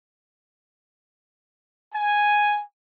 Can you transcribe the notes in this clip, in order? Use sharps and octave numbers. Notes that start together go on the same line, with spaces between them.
G#5